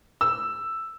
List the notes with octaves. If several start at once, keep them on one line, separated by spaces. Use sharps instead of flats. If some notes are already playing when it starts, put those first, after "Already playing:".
E6